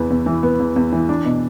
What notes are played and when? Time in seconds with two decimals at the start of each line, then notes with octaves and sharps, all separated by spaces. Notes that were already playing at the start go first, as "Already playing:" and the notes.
Already playing: E2 E3 B3
0.10 E2
0.26 E3
0.43 B3
0.60 E2
0.76 E2
0.92 E3
1.09 D4
1.26 B2